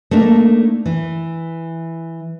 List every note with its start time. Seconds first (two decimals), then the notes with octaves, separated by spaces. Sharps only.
0.11 A3 A#3 D4 D#4
0.86 E3